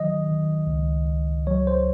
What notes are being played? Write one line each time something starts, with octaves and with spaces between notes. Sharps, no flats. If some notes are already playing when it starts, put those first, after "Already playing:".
Already playing: D#3 F#3 D#5
D#3
C#2
C#2
F#3 C#5
C5